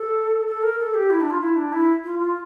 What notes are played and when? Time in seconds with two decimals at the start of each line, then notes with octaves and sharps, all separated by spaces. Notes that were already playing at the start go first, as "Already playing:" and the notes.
Already playing: A4
0.47 A4
0.63 A#4
0.79 A4
0.94 G4
1.10 E4
1.21 D4
1.30 F4
1.41 E4
1.56 D4
1.73 E4
2.04 F4
2.19 F4